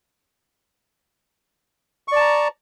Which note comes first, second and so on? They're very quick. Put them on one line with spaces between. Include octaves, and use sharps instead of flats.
C#6 D5 A5 A#5